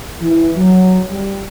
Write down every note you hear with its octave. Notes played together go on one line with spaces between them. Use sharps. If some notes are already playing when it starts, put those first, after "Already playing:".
E3
F#3
G3